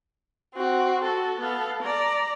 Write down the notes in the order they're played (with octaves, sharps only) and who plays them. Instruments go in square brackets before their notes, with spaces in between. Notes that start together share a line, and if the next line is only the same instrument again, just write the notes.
[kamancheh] C4 F#4
[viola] F#4 [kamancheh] A4
[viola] B3 F5
D5 A#5